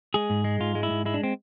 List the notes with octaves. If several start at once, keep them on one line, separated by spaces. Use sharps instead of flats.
G#3 G#4
G#2
G#3
G#2 F4
G#3
E4
G#2
G#3 E4
D4
C4